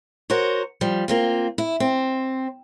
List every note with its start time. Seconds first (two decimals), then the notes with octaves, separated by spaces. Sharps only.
0.30 F#4 A#4 C5 C#5
0.81 F3 G3
1.08 A#3 C4 F4
1.58 E4
1.80 C4